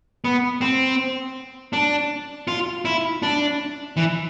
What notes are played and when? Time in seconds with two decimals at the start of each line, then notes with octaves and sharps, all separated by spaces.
0.25 B3
0.61 C4
1.73 D4
2.48 F4
2.85 E4
3.23 D4
3.97 E3